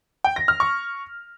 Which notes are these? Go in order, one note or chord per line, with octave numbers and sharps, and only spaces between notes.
G5
A#6
F6
C#6